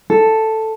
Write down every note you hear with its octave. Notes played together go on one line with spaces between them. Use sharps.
A4